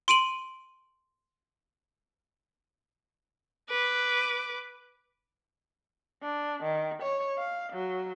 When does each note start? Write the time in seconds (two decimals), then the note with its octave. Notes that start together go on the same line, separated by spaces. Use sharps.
0.08 C6 D7 D#7 F#7
3.69 B4 D6
6.22 D4
6.63 D#3
7.02 C#5
7.39 F5
7.73 F#3